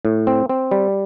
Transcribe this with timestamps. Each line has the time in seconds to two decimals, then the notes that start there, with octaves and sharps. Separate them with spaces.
0.05 A2
0.27 C4
0.49 C4
0.71 G3